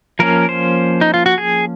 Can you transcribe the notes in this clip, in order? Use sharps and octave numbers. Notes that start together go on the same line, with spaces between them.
F3 A#3 C#4 A#4
C5
D#4
F4
F#4
G#4